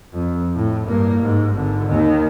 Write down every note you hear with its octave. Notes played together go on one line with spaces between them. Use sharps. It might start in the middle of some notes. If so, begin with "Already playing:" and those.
F2
A2
G2 A#3
G#2
G#1 D3
D#2 D#3